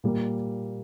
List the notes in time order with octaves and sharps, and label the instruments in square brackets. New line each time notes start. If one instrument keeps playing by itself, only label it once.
[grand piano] A#2 G3 A#3